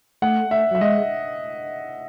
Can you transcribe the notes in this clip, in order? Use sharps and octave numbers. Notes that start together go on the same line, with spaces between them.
A3 F#5
E5
F#3 E5
G#3 D#5